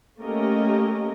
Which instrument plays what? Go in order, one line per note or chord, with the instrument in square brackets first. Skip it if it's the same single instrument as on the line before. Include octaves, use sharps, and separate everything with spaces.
[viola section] A3 A#3 C#4 G4 A#4 D#5